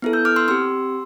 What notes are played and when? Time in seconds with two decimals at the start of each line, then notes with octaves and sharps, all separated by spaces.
0.02 B3 E4 A4
0.13 E6 G6
0.25 D6 F6
0.36 C6 E6
0.48 C4 G4 C6 E6